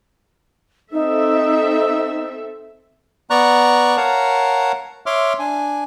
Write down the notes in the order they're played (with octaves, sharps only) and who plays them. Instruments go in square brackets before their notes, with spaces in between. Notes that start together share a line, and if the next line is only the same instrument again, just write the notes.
[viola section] C4 A4 E5 [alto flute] D#4
[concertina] B3 D5 A#5 C#6 F#6
A#4 C#5 F5 F#5 A5 A#5
C#5 E5 C6 D6 F6
D4 G#5